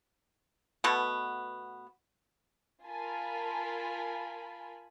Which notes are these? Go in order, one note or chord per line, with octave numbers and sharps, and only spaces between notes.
B2 A3 B3
F4 A#4 G#5 A5 B5